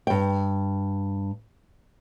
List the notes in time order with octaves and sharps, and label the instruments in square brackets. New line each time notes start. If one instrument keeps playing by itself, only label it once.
[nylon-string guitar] G2 G5